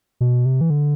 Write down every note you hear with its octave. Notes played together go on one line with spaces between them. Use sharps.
B2
C3
E3
D3